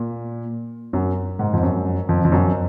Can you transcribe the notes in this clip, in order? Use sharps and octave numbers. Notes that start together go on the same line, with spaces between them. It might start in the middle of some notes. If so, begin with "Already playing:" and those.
Already playing: A#2
F#2
G#2
F2
F#2
F2
F2
F#2